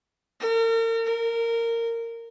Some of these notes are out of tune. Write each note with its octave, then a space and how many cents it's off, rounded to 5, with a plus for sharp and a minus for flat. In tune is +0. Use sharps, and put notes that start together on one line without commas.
A#4 -40
A#4 -15